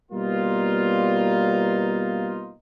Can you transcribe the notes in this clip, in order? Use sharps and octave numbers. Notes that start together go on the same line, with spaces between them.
B2 G3 A#3 B3 D#4 F4